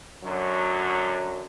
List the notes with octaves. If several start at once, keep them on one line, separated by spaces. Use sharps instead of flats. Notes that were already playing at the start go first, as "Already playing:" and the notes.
F#2 D3 F#3